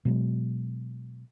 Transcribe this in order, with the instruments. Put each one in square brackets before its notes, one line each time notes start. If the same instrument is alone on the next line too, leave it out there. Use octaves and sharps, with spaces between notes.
[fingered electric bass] B2 F#3 G#3